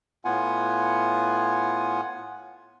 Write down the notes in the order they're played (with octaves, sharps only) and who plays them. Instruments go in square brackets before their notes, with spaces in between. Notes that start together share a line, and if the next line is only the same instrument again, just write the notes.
[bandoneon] A2 B3 F4 F#5 G#5